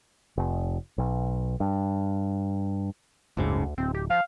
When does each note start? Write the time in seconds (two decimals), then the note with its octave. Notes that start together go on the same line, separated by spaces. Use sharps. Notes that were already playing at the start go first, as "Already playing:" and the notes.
0.37 F1
0.98 B1
1.60 G2
3.37 F#1 D2 G#2 C#3
3.78 D1 C4
3.95 G4
4.10 F3 F5